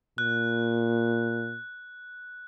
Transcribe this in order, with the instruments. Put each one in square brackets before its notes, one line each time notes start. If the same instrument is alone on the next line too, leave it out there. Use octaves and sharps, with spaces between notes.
[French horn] A#2 [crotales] F#6